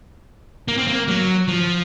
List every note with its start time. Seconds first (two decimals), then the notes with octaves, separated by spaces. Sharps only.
0.68 A#3
0.77 C4
0.87 A#3
1.08 F#3
1.48 F3